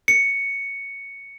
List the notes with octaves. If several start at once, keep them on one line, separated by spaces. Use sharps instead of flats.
C#7